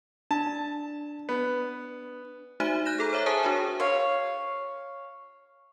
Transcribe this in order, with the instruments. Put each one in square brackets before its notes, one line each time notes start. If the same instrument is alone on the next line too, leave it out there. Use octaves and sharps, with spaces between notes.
[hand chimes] D4 [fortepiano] A5
[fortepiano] B3
[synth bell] A3 D#4 F#4 C5 E5 D#7
F#6 G6 A#6 E7
G#4 A4 A#5
C5 C#5 E5 D6
G#4 C5 E5 G#5 A5 D#6
D4 F#4 G#4 A#4 C#5
[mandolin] C#5 F5